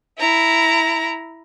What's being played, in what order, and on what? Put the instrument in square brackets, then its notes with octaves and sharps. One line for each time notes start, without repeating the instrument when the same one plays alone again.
[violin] E4 A#5